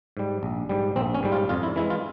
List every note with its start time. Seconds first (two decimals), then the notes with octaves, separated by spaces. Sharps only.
0.17 G#2 G3
0.43 A#1
0.69 G#2 G3
0.96 A#1 C4
1.15 C#4
1.23 G#2 G3
1.32 F4
1.49 F2 F4
1.63 E4
1.76 E3 G#3 E4
1.90 F4